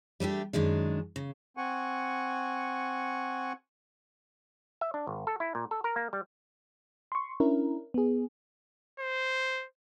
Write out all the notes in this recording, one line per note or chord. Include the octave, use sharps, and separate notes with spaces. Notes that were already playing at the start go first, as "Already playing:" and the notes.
G3 A3 D4 G4
F#2 D#3 G#3 D4
C#3
C4 F#5 G#5 C#6
E5
D4
G#1
A4
E4
A#2
A4
A#4
A#3
G3
C6 C#6
C#4 D4 E4 A#4
B3 G#4
C5